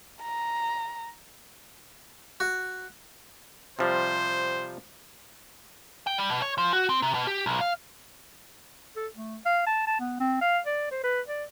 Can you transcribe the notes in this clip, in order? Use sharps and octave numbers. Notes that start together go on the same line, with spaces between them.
A#5
F#4
C3 F3 G3 C5
G5
G3
B2
C#5
F3
F#4
C4
C3
B2
G4
B1
F5
A4
A3
F5
A5
A5
B3
C4
F5
D5
C5
B4
D5